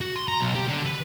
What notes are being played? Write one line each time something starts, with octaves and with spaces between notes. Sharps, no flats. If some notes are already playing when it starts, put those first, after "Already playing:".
F#4
C6
A#5
B1
G4
D3
B4